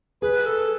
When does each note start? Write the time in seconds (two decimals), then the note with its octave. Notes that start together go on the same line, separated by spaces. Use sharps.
0.22 G#4 B4
0.46 A4